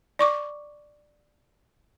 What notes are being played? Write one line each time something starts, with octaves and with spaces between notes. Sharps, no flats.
D5 C#6 D6